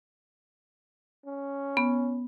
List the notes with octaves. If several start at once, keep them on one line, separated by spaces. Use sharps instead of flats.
C#4
B3